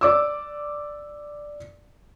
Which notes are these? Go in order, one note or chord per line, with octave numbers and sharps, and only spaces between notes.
D5 D6 E6